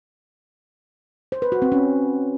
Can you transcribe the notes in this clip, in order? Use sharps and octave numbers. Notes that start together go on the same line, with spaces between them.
C5
B4
F#4
C4
C#4